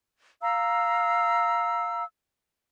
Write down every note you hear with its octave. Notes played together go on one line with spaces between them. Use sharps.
F5 A#5 E6